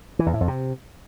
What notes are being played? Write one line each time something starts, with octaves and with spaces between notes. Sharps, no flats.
E3
E2
A2
F2
C3